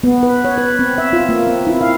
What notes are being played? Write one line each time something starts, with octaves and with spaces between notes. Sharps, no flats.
B3
B4
C#5
B4
C4
E5
F4
A#3
C4
E4
F5